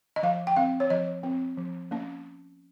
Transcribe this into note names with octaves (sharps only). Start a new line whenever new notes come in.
D#5
F3 F5
G5
C4 F5
C#5
F3 D#5
C4
F3
A#3 C#4